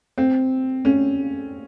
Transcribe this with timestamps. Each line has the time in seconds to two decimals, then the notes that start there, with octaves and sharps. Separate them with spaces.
0.18 C4
0.85 C#4